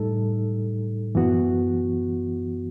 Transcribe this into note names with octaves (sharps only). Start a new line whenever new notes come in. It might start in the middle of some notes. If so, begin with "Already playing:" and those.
Already playing: A2 G3 D#4 A4
F#2 E3 B3 F#4